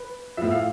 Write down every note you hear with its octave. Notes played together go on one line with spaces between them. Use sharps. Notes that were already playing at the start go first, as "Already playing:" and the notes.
Already playing: B4
A2 F3 E5
F5